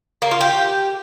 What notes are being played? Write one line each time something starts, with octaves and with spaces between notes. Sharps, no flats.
A#3
F4
G4